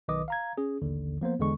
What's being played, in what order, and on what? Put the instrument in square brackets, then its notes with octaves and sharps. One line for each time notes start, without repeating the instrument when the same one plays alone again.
[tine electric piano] B1 D#3 B4 D#5 D6 D#6
F5 A#5 G#6
C#4 G#4
A1 D#2 D3
F3 A#3 B3 C5
E2 D3 G#3 C#6